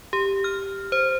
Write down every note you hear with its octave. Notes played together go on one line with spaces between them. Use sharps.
G4
F6
C5